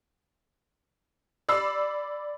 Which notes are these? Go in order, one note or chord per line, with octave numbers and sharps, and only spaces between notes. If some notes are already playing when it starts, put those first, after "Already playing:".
D5 B5 E6 C7